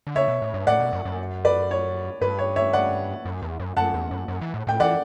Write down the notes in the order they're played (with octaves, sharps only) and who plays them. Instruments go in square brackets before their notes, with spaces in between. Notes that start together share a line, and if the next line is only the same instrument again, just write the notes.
[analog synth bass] D3
[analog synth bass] C#3 [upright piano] C#5 E5
[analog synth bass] B2
A2
G2
[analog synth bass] A2 [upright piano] D5 F#5
[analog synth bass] B2
F#2
F#2
[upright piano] B4 D5
C#5
[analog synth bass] G2 [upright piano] B4
[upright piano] C#5
C#5 E5
D5 F#5
[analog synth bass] F#2
E2
F#2
[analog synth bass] F#2 [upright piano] F#5 A5
[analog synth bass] E2
F#2
F#2
E3
A2
[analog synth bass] A2 [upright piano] G5
[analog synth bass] E3 [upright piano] D5 F#5